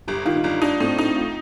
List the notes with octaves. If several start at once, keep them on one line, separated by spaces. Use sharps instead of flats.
G1 G4
D#3 F4
D#4
G1 D4
D4 D#4
A2 C4
D4 D#4
F4